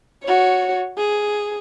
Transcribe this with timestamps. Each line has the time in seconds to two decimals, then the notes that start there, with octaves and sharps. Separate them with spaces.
0.23 F#4 C#5
0.98 G#4